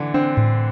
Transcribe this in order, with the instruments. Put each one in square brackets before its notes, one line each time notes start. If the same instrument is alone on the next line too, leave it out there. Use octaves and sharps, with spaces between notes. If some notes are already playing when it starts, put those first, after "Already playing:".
Already playing: [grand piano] D3 E3
[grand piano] C4 [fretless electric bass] D4
[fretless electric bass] A2